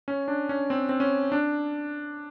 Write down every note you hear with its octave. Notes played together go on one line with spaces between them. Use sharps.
C#4
D4
C#4
C4
C4
C#4
D4